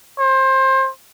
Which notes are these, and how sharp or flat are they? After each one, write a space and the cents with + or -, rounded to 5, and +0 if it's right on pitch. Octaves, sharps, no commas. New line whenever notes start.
C5 +25